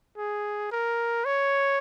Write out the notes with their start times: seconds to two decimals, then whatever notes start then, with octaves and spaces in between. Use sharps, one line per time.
0.17 G#4
0.72 A#4
1.25 C#5